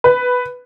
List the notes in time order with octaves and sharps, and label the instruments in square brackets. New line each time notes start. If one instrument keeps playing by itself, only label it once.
[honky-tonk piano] B4